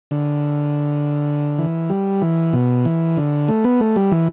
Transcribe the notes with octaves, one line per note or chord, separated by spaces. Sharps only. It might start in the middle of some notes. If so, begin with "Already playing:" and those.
D3
E3
G3
E3
B2
E3
D3
A3
B3
A3
G3
E3